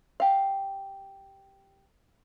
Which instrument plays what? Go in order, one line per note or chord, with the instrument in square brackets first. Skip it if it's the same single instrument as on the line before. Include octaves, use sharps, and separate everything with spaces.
[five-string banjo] G4 F5